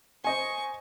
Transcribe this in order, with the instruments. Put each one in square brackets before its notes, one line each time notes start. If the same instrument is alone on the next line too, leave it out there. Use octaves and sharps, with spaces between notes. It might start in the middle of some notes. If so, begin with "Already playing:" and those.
[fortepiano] C5 D#5 G#5 [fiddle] C#6